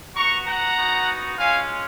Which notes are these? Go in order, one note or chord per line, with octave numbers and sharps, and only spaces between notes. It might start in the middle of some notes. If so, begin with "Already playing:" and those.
B3 F#4 A#5 C#6
F#5 A#5
B3 D#4 F#4
G#3 C#4 F4 F5 G#5